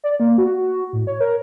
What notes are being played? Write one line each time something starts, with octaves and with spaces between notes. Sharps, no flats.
D5
A#3
F#4
A2
C#5
A#4